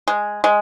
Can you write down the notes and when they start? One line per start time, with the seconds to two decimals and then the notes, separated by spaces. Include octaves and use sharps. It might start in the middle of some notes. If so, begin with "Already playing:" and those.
0.08 G#3
0.44 G#3